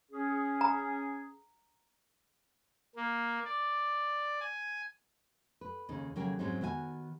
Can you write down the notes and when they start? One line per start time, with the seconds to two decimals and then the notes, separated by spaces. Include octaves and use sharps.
0.11 C#4 G#4
0.61 A#5
2.96 A#3
3.44 D5
4.40 G#5
5.61 B4
5.89 D#2 C#3 D#4
6.16 D#2 C#3 F#3 A#4 G5 G#5
6.39 G#2 F#3 G#3 C4 C#4 D#4
6.61 D#3 B3 F#4 E5 G#5